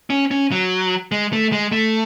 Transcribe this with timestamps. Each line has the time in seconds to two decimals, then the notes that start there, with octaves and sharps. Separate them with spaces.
0.10 C#4
0.31 C#4
0.52 F#3
1.12 G#3
1.33 A3
1.52 G#3
1.72 A3